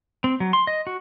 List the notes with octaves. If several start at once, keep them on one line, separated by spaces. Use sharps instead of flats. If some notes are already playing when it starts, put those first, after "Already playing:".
C4
F#3
C6
D#5
F#4